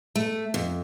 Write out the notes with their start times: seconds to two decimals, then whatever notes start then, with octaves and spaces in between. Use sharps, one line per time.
0.16 A3
0.54 F2